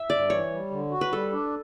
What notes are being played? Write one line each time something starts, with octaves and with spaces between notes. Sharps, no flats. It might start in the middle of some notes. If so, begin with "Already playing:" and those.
Already playing: E5
G2 D5
E3 C#5
G3
D3
F#4
B4
G3 A4
D4